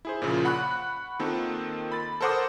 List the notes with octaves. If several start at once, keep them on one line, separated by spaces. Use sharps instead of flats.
E4 G#4 C5
A#2 C#3 F3
F#5 B5 C#6 F#6
D#3 A#3 C4 F4 A4
B5 A6
A4 A#4 C5 F#5 D6 D#6